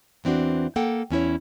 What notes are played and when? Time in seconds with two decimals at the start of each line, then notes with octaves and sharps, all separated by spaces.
0.24 E2 E3 C4 D4 F#4
0.76 A#3 A4 F#5 G5
1.10 E2 C#4 E4 C#5